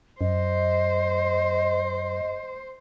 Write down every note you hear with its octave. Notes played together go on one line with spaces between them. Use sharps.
F#2 C5 D#5